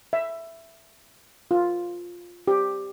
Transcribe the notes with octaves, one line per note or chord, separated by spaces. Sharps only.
E5
F4
G4